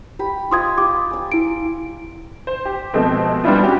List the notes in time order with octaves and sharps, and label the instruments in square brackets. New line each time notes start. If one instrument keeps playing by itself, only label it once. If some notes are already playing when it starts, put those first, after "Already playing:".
[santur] G4 B5
[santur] F4 D5 D#5 [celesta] C6 D#6 G#6
[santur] G4 [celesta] D6
[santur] D5 G#5
[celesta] E4 D7 [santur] C6
[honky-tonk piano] C5
G4
B2 F3 G#3 A3 C4
G3 B3 C4 D4 E4 F4
C#4 F#4 G4